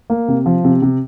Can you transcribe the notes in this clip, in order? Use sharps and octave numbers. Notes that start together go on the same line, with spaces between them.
A#3
C3
F3
C3
C3